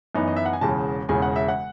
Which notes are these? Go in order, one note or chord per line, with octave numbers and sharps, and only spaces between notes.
F#2 E3 B3 D#4
D#5
E5
F#5
G#5
E1 E2 C#3 A5
E1 E2 C#3 G#5
F#5
E5
F#5